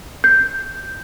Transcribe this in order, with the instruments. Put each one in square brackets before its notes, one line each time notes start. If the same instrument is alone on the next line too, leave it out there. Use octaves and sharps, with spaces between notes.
[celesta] G6